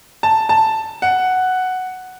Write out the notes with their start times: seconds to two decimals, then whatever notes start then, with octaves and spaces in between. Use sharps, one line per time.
0.23 A5
0.49 A5
1.02 F#5